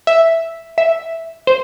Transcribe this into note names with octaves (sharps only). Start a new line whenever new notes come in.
E5
E5
C5